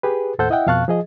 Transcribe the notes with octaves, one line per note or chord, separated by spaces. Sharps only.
G4 G#4 B4
D#2 A2 A4 C5 F#5 G6
E4 D#5 E5 F#5 G5
F2 B2 F5 A5 C#6 F#6
F3 G#4 D#5